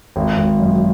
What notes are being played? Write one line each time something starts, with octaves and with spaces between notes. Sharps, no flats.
G#1
G#1
F#2